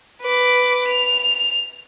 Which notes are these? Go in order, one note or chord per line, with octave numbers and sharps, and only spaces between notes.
B4 D6
F7